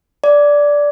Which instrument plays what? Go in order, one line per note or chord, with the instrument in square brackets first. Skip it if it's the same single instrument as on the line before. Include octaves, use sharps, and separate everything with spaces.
[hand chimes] D5